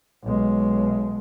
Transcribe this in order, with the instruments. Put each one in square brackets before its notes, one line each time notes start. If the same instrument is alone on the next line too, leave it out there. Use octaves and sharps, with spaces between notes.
[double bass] B1 G#3